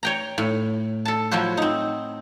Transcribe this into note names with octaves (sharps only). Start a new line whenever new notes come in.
C#5 G5 A#5
A2
A4 A5
F3 F#3 E4 F#4 C5
C4 D#4